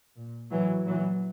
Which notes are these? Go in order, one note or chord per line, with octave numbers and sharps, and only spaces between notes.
A#2
A2 E3 F#3
A#2 E3 F#3